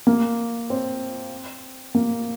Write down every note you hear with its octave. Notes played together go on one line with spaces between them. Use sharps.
A#3
C4
A#3